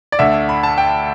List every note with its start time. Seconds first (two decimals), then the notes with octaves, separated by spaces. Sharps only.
0.12 D5
0.19 D2 D3 E5
0.49 B5
0.63 A5
0.78 G5